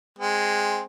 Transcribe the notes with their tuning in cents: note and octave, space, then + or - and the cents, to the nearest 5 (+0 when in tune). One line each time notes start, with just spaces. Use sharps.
G#3 -5 C4 +0